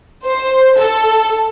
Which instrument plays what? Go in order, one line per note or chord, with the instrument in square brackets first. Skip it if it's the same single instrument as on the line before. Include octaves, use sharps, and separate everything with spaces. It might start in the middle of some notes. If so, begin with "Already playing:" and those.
[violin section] C5
A4